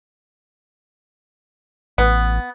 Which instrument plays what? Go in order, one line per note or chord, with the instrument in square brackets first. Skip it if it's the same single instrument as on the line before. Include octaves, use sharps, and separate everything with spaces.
[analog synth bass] A1 [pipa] B3